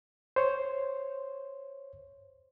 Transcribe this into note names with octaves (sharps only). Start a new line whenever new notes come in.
C5 C#5